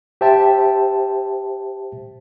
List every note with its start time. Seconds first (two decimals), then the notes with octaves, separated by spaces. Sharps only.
0.21 G4 C5 E5 G5 A5